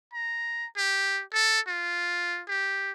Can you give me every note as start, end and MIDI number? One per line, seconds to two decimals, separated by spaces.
0.14 0.66 82
0.77 1.22 67
1.33 1.60 69
1.67 2.42 65
2.48 2.92 67